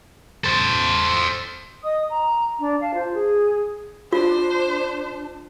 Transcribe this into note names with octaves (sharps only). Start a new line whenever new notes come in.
A4 C5
D#5 D#6
A#5
D4
F5 A5
F4 C5
G#4
D4 F4 C5